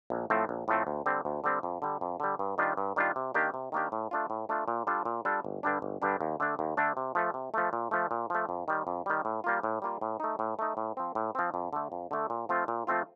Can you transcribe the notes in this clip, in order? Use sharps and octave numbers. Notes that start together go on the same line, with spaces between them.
A#1
A2 F3 A3 C4
A#1
A2 F3 A3 C4
D2
D3 G3 C4
D2
D3 G3 C4
F2
D3 G3
F2
D3 G3
G2
D#3 G3 D4 F4
G2
D#3 G3 D4 F4
C3
D#3 A#3 D4 G4
C3
D#3 A#3 D4 G4
A2
A3 D4 F4
A2
A3 D4 F4
A#2
G3 D4 F4 A4
A#2
G3 D4 F4 A4
G1
G2 D3 G3 D4
G1
G2 D3 G3 D4
D#2
D3 A3 D4
D#2
D3 A3 D4
C3
F3 A3
C3
F3 A3
A#2
F3 A3
A#2
F3 A3
F2
D#3 G3
F2
D#3 G3
A2
G3 A#3 F4
A2
G3 A#3 F4
A2
A3 D#4
A2
A3 D#4
A2
F3 C4
A2
F3 C4
F2
D3 A3
F2
D3 A3
A#2
F3 A3 C4 F4
A#2
F3 A3 C4 F4